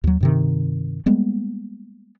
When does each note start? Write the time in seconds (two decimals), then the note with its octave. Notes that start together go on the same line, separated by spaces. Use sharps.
0.04 D#2 F#3
0.21 G2 C3 D#3
1.06 G3 G#3 A#3 B3